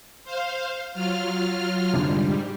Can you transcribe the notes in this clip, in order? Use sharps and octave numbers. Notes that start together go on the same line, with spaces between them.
C5 F5
F#3 F4 F6
C2 F2 G#2 D3 G3